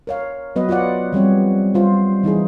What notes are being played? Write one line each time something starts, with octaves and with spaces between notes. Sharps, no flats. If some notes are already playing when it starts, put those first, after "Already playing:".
A#4 C#5 F5
F#3 B3 B4 D#5
F4 C#5 D5 F#5
F3 G3 C4 C#5
G3 F4 C5 E5
E3 D#4 E4 G#4